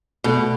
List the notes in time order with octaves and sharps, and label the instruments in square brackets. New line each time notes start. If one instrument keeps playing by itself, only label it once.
[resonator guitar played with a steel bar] B2 [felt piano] A3